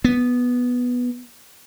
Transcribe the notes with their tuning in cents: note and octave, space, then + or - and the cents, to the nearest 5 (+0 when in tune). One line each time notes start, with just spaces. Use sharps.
B3 -5